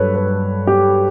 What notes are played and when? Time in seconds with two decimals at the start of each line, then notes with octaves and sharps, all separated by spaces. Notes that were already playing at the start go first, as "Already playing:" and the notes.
Already playing: G2 F#3 A4 B4 C#5
0.15 B4
0.67 G4